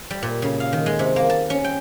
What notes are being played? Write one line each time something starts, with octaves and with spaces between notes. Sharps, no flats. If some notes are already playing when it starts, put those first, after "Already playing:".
G3
A#2
C#3
F5
D#3
G#3
C3
A#3
A5
C#4
G5